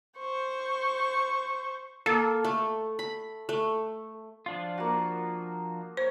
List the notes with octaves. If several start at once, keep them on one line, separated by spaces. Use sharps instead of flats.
C5 C#6
A#3 A4
A3
B5
A3
F3 D4 F4
A#3 F#4
C5 C#5